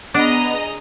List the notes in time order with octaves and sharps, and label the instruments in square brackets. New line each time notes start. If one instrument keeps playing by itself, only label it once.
[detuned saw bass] B3 [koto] D4 [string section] G#4 D#5 A#5